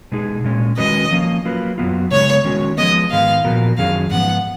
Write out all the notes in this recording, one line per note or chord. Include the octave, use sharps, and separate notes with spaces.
B2 G#3 D#4 G#4
A#2 G#3 C#4
D#3 G#3 C#4 F#4 B4 D#5
F3 A#3 C#4
F#3 A#3 F4 B4
F#2 D#3 F#3 B3 F4
C#3 G#3 B3 C#5
D#3 G#3 C#4 F#4
F3 G#3 B3 D#5
G#2 D#3 G#3 B3 D#4 F5
A#2 F3 B3 F#4 A#4
F#2 D#3 F#3 C#4 G#4 F5
G#2 F3 B3 F#5